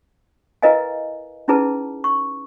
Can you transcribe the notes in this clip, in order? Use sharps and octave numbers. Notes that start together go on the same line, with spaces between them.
E4 A#4 B4 D#5 F5 G#5
C#4 D#4 E4 G#4 B4 A5
C#6